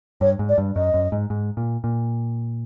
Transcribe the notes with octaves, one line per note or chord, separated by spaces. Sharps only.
G2 C#5
G#2
D5
G2
F#2 D#5
F#2
G#2
G#2
A#2
A#2